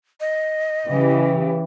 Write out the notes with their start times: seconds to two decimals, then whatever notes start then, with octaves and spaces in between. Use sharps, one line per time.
0.20 D#5
0.88 C#3 E3 G4